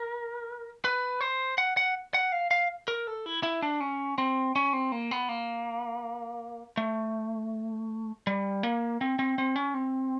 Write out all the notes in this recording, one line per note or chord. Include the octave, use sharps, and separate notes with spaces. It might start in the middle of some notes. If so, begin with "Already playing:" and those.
Already playing: A#4
B4
C5
F#5
F#5
F#5
F5
F5
A#4
A4
E4
E4
D4
C#4
C4
C#4
C4
A#3
B3
A#3
A3
G3
A#3
C4
C4
C4
C#4
C4